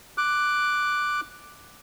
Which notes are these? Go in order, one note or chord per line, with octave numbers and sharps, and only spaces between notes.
D6 F#6